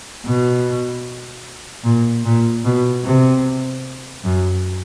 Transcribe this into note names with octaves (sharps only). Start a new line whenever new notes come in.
B2
A#2
A#2
B2
C3
F#2